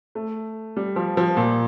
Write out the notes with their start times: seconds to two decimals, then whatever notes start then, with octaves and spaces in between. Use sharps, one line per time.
0.15 A3
0.77 G3
0.96 F3
1.17 F3
1.37 A#2